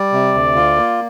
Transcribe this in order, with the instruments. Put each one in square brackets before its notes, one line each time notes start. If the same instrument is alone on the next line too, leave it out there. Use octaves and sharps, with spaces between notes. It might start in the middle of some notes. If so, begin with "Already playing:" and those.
Already playing: [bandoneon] G3 [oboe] D5
[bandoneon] C3
D2
F4
A#3